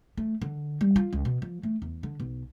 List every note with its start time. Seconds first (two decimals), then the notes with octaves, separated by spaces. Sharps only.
0.17 A3
0.42 D3
0.81 G3
0.96 F4
1.13 C#2
1.25 B2
1.42 F3
1.63 A3
1.82 E2
2.03 D3
2.20 B1